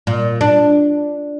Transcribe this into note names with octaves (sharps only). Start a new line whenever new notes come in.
A#2
D4